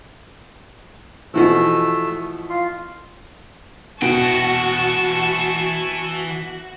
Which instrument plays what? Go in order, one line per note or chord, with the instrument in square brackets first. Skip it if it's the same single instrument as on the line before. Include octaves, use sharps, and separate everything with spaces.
[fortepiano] B2 E3 F3 [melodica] A3 E6
[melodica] F4 C6
[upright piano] B2 [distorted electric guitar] E3 G5 [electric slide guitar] F#4 [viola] A5 C#6